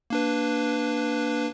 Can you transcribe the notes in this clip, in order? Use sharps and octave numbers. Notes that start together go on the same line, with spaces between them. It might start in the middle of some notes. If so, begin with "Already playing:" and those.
A#3 D4 B4